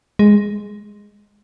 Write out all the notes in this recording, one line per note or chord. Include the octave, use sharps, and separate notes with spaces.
G#3